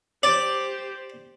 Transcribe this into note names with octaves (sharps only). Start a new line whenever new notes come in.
G4 C5 D5